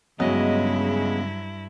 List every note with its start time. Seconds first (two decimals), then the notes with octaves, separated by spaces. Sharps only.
0.20 G2 C#3 F#3 G#3 B3 E4 D#5